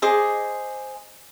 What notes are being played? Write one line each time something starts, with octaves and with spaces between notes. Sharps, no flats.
G#4 C5 D#5 D6